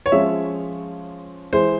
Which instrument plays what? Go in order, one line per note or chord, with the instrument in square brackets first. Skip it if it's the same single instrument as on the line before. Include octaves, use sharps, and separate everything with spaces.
[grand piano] C#5
[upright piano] F3 G#3 C#4 [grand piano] E5
[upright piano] E3 G#3 E4 G#4 [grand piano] C5